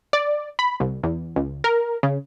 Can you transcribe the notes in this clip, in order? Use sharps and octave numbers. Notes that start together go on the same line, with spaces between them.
D5
B5
C2
E2
C#2
A#4
C#3